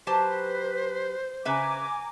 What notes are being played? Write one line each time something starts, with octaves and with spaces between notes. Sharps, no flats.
F#3 G4 B4 C5 A5
C#3 B4 E5 G#5 A#5 D6